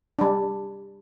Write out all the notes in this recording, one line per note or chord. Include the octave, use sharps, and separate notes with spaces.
G3 D4